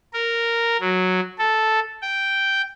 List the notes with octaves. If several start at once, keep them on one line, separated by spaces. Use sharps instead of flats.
A#4
F#3
A4
G5